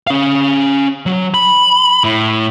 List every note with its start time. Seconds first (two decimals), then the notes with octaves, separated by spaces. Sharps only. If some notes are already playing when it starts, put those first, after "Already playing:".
0.07 C#4 F5
1.06 F#3
1.34 B5
2.04 A2